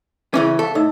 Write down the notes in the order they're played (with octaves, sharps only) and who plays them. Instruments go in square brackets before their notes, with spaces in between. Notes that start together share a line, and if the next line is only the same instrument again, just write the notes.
[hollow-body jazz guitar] C#3 E3 C#4 [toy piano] C#5 E5 D6
[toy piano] E5
[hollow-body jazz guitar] A4 [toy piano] F5 C#6
[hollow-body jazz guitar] A2 [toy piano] D#4 D#5 E6